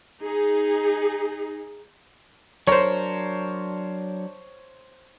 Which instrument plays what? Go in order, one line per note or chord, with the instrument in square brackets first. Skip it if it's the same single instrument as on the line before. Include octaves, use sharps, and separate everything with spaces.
[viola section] D#4 G#4
[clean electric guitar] F#3 D4 A#4 [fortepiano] C5 C#5